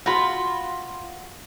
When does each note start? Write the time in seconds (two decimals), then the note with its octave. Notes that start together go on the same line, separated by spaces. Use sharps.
0.06 F4 F#4 B5